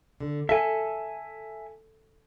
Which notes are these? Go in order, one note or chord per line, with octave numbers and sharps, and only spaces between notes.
D3
A4 E5 G#5